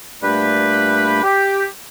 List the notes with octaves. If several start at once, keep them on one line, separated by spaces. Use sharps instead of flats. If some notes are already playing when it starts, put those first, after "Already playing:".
A#2 G3 A3 D4 G4 B4
G4